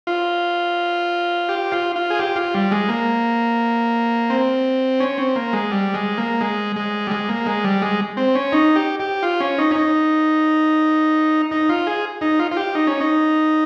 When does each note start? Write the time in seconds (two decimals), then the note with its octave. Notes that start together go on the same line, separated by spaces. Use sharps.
0.07 F4
1.49 G4
1.72 F4
1.96 F4
2.10 G#4
2.19 G4
2.36 F4
2.54 G3
2.71 G#3
2.89 A#3
4.30 C4
5.00 C#4
5.18 C4
5.36 A#3
5.53 G#3
5.71 G3
5.94 G#3
6.18 A#3
6.41 G#3
6.76 G#3
7.07 G3
7.11 G#3
7.29 A#3
7.46 G#3
7.64 G3
7.82 G#3
8.17 C4
8.35 C#4
8.52 D#4
8.76 G4
9.00 G4
9.23 F4
9.40 C#4
9.58 D#4
9.71 C#4
9.75 D#4
11.51 D#4
11.69 F4
11.87 G#4
12.21 D#4
12.39 F4
12.52 F4
12.57 G4
12.75 D#4
12.87 C#4
13.00 D#4